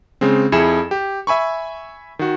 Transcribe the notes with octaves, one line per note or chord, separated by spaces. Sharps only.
C#3 G#3 C4
F2 E4 G#4 C#7 E7
G4
E5 G#5 B5 C#6
D#3 F#4